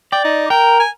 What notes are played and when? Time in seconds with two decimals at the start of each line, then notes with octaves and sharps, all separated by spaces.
0.12 D5 G5
0.24 D#4
0.50 A#4 G5
0.80 G#5